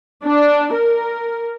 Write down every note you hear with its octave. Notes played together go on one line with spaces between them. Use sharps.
D4
A#4